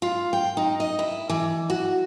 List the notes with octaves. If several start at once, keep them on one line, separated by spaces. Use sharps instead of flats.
F4
G5
D#4
D#5
E4
E3
F#4